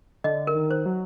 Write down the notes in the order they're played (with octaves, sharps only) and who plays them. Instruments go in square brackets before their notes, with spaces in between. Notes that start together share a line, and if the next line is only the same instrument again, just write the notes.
[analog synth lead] D3 [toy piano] D#5
[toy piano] A#4
[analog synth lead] D#3
[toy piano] C5
[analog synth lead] F#3